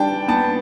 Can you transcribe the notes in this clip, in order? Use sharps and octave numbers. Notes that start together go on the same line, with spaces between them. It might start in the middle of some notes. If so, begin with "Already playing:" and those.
Already playing: G3 D4 G5 A5
B3 A5